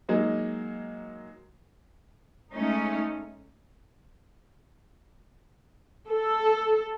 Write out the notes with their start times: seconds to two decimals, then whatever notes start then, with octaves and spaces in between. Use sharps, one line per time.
0.09 F#3 G#3 A#3 D#4
2.51 G#3 A3 C#4 D#4
6.10 A4